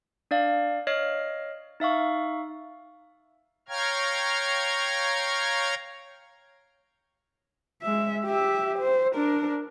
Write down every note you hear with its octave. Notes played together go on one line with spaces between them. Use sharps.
D4 D5 F5
C#5 D#5 F6 C7
D#4 E5 F5 C#6
C#5 F5 G5 A#5 F6 G#6
G#3 E5
G4 E5
C5
D4 A#4